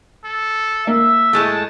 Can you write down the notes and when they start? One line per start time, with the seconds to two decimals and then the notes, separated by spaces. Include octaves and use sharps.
0.25 A4
0.87 A#3 E5
1.33 A2 G#3 A3 A5